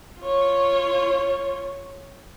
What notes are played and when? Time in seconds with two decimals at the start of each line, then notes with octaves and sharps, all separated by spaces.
0.20 F4 C#5